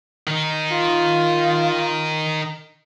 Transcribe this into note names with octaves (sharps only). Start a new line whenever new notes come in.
D#3 D#4
F4